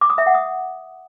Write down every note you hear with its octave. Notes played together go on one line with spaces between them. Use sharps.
D6
D#6
E5
F#5
D#6